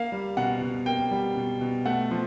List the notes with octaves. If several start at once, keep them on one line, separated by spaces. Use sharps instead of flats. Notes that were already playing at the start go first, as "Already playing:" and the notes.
Already playing: A#3 F5
G3
B2 F#5
B2
A#3 G5
G3
B2
B2
A3 F#5
F3